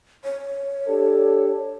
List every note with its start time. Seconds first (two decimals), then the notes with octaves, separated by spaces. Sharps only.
0.25 C#5
0.87 D4 G4 A4